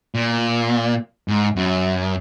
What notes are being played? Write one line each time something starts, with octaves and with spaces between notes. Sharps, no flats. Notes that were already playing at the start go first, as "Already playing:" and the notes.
A#2
G#2
F#2